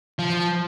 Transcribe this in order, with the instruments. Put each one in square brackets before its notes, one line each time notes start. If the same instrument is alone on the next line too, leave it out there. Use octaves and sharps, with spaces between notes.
[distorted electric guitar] F3